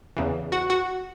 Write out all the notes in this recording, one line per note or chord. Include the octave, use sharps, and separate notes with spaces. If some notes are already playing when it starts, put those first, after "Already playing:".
E2 C#3 E3
F#4 F#5
F#4 F#5